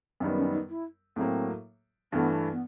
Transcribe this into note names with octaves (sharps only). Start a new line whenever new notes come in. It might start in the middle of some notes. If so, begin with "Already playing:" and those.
F#2 D#3 G3 B3 D4
C#4
D#4
E4
A2 F#3 A#3 C4
G2 E3 A3 B3
B3